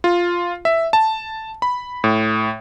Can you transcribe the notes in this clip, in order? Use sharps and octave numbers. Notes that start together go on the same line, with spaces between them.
F4
E5
A5
B5
A2